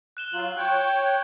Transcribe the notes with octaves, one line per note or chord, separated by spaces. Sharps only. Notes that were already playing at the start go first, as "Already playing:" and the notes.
F#6 E7 G7
F#3 F4 F#7
C#5 G5 F#6 G6
G#6